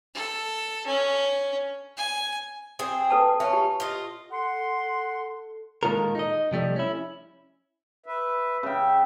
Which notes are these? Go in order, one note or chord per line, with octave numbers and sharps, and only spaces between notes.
A4
C#4
G#5
C4 G#4
A4 B4 A5
C#4 E5 A5
G4
F4 D#5
A4 F#5 C6
A#2 D#3 G#3 F4 A4 A#4
D#4 D#5
C3 F3 G3 A3
C#4 E4
B4 E5
C#3 E5 G5